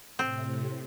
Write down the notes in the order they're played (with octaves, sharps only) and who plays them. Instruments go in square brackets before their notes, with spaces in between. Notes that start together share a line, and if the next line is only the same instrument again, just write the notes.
[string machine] A2 C3 [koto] C4